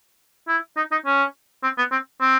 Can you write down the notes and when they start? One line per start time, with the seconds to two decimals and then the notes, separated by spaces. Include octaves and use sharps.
0.48 E4
0.77 D#4
0.92 D#4
1.06 C#4
1.63 C4
1.78 B3
1.92 C4
2.21 C4